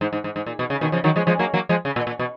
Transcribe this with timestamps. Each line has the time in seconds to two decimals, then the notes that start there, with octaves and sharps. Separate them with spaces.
0.01 G#2
0.13 G#2
0.24 G#2
0.36 G#2
0.46 A#2
0.59 B2
0.70 C#3
0.81 B2 D#3
0.92 C#3 F3
1.04 D#3 F#3
1.16 F3 G#3
1.27 F3 G#3
1.39 F#3 A#3
1.54 F#3 A#3
1.69 F3 G#3
1.85 C#3
1.96 A#2
2.07 A#2
2.19 B2